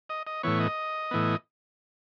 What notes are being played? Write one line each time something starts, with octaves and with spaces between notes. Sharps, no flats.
D#5
D#5
A2 E3 B3 C#5
D#5
A2 E3 B3